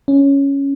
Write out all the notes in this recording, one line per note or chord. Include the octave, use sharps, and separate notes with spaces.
C#4